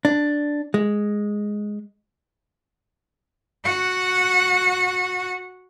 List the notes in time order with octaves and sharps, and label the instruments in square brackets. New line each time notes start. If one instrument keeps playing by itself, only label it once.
[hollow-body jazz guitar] D4
G#3
[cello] F#4 F#5